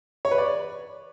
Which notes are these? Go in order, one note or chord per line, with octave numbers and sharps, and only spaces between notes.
C#5
B4
D5